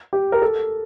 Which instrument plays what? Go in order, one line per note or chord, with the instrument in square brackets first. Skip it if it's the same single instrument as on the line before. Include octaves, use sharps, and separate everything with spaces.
[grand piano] G4
A#4
A4